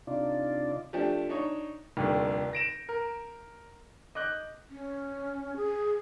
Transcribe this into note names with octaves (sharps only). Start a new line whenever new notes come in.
C3 D4 D#4 F4 D5
F3 A3 D4 G4
D4 D#4 C#5
F1 D#2 D3 G3
A#6 D7 E7
A#4
D#5 D6 F#6 G6
C#4
G#4